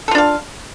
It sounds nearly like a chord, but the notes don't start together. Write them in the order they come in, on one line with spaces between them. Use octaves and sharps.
A4 F4 D4 F5